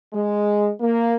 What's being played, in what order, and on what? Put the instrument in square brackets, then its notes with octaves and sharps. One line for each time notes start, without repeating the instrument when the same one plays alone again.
[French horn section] G#3
A#3